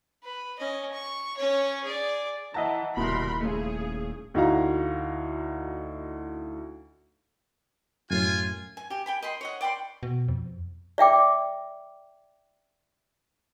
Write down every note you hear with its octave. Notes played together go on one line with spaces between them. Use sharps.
B4
C#4 D#5
C#6
C#4 C#5
G#4 D5
E3 D#5 E5 F#5 A5 A#5
D#1 C2 B2 E4 A#4 B5 C6
C#3 A3 G#4
D2 D#4 E4 F#4 F5 A#5
F#2 A2 F4 G#5
G#5
G4 G#5
G5 G#5 B5
D#5 B5 C6
C#5 D#5 F#5
D5 G5 B5 C6
B2
F2
D5 E5 G5 D6